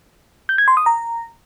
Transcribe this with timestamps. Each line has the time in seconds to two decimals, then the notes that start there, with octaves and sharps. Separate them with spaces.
0.49 G6
0.58 G#6
0.68 C6
0.77 D#6
0.86 A#5